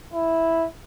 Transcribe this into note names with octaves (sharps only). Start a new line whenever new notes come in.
E4